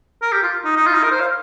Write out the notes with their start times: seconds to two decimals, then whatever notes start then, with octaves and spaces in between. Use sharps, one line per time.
0.22 A#4
0.32 G4
0.43 F4
0.65 D#4
0.76 D#4
0.87 F4
0.95 D#4
1.03 A#4
1.12 C5
1.20 F5